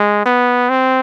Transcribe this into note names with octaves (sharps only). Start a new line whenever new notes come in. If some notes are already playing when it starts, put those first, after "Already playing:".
Already playing: G#3
B3
C4